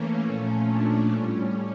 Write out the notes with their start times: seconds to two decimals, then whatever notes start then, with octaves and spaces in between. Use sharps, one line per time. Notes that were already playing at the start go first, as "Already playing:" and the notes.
Already playing: E3 A3 A#3 C#4
0.24 A#2 F3 A3 C#4
0.67 D4
1.11 A2 G3 C#4